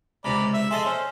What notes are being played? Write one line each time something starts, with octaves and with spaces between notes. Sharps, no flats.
C#2 C3 D5 A#5 B5
E5
G#4 A4 D#5 E5 C6
C#4 C5